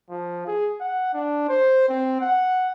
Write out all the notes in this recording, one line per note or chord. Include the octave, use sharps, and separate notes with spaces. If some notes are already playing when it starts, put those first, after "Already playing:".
F3
G#4
F#5
D4
C5
C4
F#5